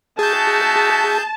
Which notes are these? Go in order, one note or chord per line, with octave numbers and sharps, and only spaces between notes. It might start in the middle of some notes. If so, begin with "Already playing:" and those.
D#4 F#4 G#4 E5 A5 G6